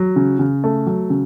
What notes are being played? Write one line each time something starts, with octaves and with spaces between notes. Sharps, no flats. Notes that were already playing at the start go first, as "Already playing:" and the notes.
Already playing: F#3
C#3
C#3
A3
F#3
C#3